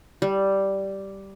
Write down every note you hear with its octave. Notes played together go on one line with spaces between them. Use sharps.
G3